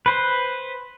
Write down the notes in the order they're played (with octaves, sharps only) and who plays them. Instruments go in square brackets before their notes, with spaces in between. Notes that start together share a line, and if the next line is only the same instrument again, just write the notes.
[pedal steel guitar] B4 C5